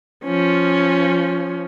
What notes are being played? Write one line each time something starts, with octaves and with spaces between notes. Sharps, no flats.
F3 C#4